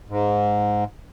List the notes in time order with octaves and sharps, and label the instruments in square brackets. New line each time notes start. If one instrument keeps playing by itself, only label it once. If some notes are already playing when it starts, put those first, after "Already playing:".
[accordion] G#2